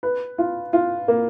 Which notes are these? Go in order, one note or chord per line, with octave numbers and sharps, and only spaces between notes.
B4
F4
F4
A#3